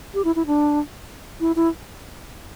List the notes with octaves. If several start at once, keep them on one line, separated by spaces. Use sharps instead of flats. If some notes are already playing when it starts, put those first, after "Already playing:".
G4
E4
E4
D4
E4
E4